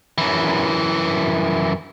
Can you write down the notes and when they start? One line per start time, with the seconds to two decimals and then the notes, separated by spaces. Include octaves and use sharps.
0.18 F#2 E3